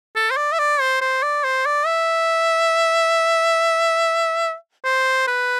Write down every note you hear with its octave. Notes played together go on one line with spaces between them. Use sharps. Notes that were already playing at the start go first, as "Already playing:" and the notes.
A4
C5
D5
E5
D5
C5
C5
D5
C5
D5
E5
C5
B4